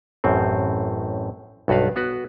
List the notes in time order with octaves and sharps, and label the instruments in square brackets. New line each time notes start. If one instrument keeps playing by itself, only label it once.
[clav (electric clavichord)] A1 F#2 A2 C4
B1 G2 F#4 B4 F5
B3 F#4 B4